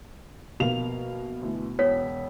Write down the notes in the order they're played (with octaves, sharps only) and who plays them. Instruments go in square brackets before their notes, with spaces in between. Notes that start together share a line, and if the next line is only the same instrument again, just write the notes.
[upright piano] A#1 A#3 F5 [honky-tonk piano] B2 F7
[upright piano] D2 E3
[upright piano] E1 B3 B6 [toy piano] C#5